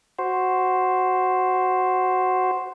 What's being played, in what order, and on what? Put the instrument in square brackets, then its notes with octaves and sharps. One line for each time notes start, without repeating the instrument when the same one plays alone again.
[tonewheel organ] F#4 C5